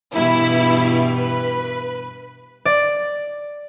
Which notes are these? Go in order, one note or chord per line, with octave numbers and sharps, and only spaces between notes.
G2 B2 E3 E4
B4
D5